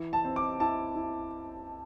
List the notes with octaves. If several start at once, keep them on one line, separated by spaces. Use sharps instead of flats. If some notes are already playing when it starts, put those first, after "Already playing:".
Already playing: E3
A5
C4
D6
E4 A5
E4